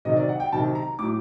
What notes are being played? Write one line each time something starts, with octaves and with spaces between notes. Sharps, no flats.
C3 D#3 F#3 D#5
D5
F#5
G5
C3 D#3 F#3 A5
A#5
A2 F#3 D6